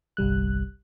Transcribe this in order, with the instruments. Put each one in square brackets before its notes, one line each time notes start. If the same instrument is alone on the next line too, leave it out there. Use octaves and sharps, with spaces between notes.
[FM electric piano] G1 C2 G3 F#6